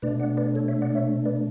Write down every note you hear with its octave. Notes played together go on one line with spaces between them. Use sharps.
B2 A3 D4 B4 D5
D5 F#5
B4 D5
A4 C#5
C#5 E5
D5 F#5
C#5 E5
B4 D5